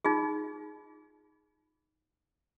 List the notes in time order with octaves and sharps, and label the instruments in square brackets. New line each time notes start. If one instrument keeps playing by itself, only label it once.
[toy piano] D#4 F4 G#4